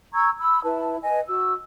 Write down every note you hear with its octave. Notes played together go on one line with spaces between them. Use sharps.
A#5 C#6 E6 G#6
B5 E6
E4 B4 A5
B4 D#5 G#5
F#4 E6